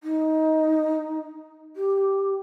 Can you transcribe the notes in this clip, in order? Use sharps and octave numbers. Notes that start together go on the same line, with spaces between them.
D#4
G4